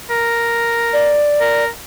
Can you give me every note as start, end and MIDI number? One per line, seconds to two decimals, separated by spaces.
0.10 1.21 70
0.93 1.64 74
1.40 1.67 70